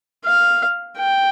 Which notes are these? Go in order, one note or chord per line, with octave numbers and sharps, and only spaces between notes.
F5
G5